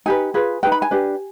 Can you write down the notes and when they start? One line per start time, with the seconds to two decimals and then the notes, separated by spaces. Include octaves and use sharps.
0.06 D#4 G4 B4 G#5
0.34 F4 G#4 B4
0.63 D#4 G#4 B4 G5
0.72 B5
0.82 G#5
0.91 D4 G4 B4